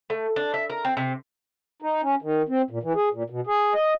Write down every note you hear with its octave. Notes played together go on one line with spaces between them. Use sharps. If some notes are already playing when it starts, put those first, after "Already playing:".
A3
D4
E5
A#4
C4
C3
D#4
C#4
D#3
C4
A#2
E3
G#4
A#2
B2
G#4
D#5